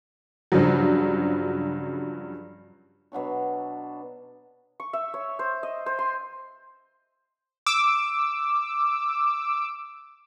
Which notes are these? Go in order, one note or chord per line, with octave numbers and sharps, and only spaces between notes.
G2 C#3 F3 F#3
B2 F#3 D4 C#6
C#6
E5
C#5
C5
D#5
C5
C6
D6 E6